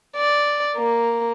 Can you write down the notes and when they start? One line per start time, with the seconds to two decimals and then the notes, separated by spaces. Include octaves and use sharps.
0.17 D5
0.77 A#3